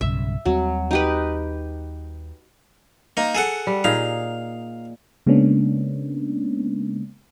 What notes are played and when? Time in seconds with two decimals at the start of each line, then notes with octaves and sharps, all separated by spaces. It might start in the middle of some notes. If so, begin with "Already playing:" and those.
0.01 B1 G2 C#3 E5
0.45 D#2 F#3 G3 C4
0.91 D#4 G4 B4
3.17 A#3 D#4
3.35 G#4 A4 F#5
3.67 G3
3.84 A#2 D#4 G#4 F5
5.26 C#3 G#3 A#3 B3 C#4 D4